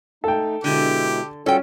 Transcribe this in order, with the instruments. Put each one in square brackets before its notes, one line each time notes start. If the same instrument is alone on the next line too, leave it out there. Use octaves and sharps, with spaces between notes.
[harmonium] A3 D#4 [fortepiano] A4 G5
[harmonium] B2 G#3 E4 [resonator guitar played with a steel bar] D3 [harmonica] G4
[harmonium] G3 F4 F#4 [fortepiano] C#4 [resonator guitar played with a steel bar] A4 G5